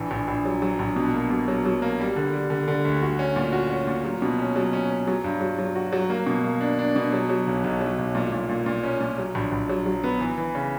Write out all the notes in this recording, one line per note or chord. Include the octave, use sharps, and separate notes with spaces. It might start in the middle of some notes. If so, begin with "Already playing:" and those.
Already playing: A#1 E3
A#1
A#1
F#3
F#3
A#1
B2
A#3
B2
F#3
F#3
A#3
G3
D3
G3
D3
D3
D2
F#4
C#4
A#2
F#4
C#4
A#2
F#3
B2
C#4
F#3
C#4
C#4
F#3
G2
F#3
F#3
F#4
F#3
A#3
B2
A#3
D4
D4
B2
F#3
F#3
B1
B1
F#3
B1
A#2
A#2
A#2
A#2
C#4
A#2
F#3
A#1
A#1
F#3
F#3
B3
E3
E3
C#3